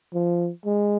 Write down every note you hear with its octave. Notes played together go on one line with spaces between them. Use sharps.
F3
G#3